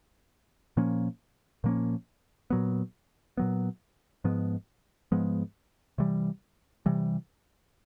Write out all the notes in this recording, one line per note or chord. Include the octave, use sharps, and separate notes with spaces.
A#2 F3 A#3 C#4
A#2 F3 A#3 C#4
A#2 F#3 B3
A#2 F#3 B3
G#2 F3 G#3 B3
G#2 F3 G#3 B3
C3 E3 G3
C3 E3 G3